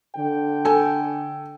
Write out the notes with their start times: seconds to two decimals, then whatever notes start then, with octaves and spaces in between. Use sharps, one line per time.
0.14 D3 G5
0.65 A4 G#5